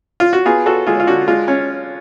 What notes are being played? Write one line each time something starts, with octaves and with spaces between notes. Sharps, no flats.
F4
F#4
B3 F4 G#4
F4 F#4 A4
G#3 F4 G#4
F4
D3 F#4
G#3 F4
C#4